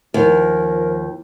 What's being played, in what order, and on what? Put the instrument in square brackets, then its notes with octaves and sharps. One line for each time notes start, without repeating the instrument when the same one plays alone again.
[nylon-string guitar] D#2 [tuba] F3 [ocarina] A#4